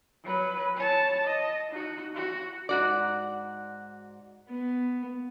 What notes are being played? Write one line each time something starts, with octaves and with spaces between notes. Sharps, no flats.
F#3 B4
C#5 A5
D#5
D#4 F#4
F#4
G#2 F#4 D5
B3